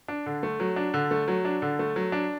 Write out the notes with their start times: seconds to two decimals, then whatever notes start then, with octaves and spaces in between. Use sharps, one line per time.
0.08 D4
0.26 D3
0.43 A3
0.60 F#3
0.76 D4
0.94 D3
1.11 A3
1.28 F#3
1.45 D4
1.62 D3
1.79 A3
1.96 F#3
2.12 D4